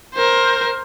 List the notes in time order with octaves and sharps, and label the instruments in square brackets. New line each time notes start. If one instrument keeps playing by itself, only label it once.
[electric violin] A#4 C5